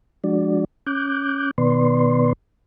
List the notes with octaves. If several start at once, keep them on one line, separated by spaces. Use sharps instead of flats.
F3 G#3 D4 F#4 D5
C#4 D6 F#6 G6
B2 D#3 B3 B4 D5 C6